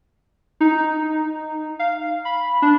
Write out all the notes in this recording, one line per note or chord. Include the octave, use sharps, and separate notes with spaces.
D#4
F5
B5
D4